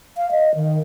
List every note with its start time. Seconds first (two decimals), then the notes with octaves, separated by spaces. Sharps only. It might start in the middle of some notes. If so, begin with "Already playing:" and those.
0.17 F5
0.31 D#5
0.55 D#3